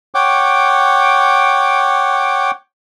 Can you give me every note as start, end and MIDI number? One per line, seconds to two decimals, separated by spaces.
0.15 2.51 73
0.15 2.51 78
0.15 2.51 79
0.15 2.51 86